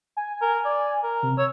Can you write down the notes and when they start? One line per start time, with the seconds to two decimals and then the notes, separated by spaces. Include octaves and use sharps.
0.17 G#5
0.42 A#4
0.65 D5
1.04 A#4
1.22 C3
1.38 C#5 E6